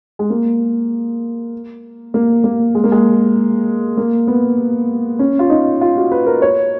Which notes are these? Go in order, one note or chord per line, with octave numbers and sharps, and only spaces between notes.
G#3
A#3
A#3
A#3
G#3
A#3
G#3
A#3
B3
C#4
F4
D#4
F4
F#4
B4
A#4
C#5